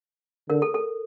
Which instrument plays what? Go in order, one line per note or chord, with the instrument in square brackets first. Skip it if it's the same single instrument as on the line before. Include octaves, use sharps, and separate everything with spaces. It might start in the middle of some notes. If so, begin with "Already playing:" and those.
[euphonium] D3 [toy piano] A#4
[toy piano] A4
A4